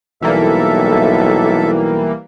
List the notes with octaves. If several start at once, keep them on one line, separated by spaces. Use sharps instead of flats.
B1 E3 G3 A#3 A4 E5